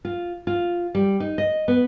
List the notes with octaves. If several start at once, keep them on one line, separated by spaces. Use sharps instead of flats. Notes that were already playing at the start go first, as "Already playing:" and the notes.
F4
F4
G3
D#4
D#5
B3